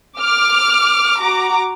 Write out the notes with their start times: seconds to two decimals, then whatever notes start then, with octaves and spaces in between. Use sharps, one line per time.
0.19 D6 F6
1.20 F#4 A#5 D6